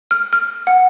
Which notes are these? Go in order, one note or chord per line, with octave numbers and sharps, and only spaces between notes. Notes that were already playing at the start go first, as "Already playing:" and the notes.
F6
F6
F#5